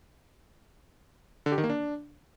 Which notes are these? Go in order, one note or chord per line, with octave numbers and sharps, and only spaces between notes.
D3
G4
D#3
A#3
D4